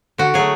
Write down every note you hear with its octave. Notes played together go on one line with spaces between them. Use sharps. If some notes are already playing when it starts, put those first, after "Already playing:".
D3 F#4
F#3 A3 G#4